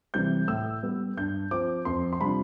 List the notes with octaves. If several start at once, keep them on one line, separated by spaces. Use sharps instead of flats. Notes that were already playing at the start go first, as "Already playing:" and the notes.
C3 E3 G3 C4 G6
A2 E6
G3 B3
G2 G6
F3 C4 D6
F2 C6
C6
C3 G3 D4 F4 B5